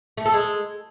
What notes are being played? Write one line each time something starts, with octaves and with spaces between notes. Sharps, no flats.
A3
A4
G#3